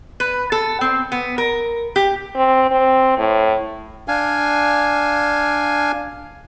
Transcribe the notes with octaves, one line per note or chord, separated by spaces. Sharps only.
B4
A4
C4
B3
A#4
G4
C4
C4
A2
D4 F5 G#5